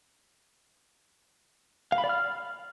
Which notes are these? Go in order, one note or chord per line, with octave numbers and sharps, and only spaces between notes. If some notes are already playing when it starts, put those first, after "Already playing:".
F5
B5
D5
F6